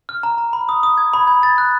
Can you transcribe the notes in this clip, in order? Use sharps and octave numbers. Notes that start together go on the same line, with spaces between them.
F6
A#5
A#5
B5
D#6
D#6
G#6
B5
G#6
A6
F#6